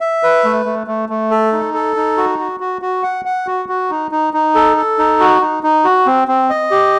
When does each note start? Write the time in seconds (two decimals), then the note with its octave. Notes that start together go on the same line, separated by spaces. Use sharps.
0.01 E5
0.23 B4
0.44 A3
0.66 A3
0.87 A3
1.09 A3
1.31 A4
1.53 D#4
1.74 A4
1.96 D#4
2.17 F#4
2.39 F#4
2.60 F#4
2.82 F#4
3.03 F#5
3.25 F#5
3.47 F#4
3.69 F#4
3.90 D#4
4.11 D#4
4.33 D#4
4.55 A4
4.77 A4
4.99 D#4
5.20 F#4
5.42 D#4
5.63 D#4
5.85 F#4
6.06 C4
6.28 C4
6.50 D#5
6.71 G4